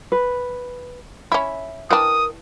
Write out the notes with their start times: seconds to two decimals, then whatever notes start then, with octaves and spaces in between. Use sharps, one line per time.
0.12 B4
1.32 C#4 E4 E5
1.90 E3 D4 A#4 G5 D#6